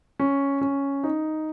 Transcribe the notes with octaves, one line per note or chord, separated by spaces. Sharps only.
C#4
C#4
D#4